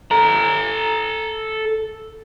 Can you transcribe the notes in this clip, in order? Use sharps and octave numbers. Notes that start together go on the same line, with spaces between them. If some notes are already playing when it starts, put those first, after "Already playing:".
A4 A#5